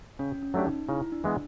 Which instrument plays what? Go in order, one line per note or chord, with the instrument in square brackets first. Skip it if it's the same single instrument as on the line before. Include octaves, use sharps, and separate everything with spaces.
[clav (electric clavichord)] C#3 [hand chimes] C#4
[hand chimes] C#4
[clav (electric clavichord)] F#3 A3 D4 G4
[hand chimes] D#4
[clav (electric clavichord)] C#3 [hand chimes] E4
[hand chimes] D4
[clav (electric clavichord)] E3 G#3 B3